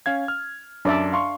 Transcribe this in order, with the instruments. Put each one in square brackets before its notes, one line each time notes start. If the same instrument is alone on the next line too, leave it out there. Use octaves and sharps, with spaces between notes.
[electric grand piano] C#4 F5 G#6
F6
[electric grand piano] F#2 [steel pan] D4 D5 E5
[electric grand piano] F5 C6 C#6